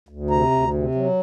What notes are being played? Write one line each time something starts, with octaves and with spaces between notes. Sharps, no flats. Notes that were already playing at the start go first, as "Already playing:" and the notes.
D2
C3 A#5
D2
C3
F#3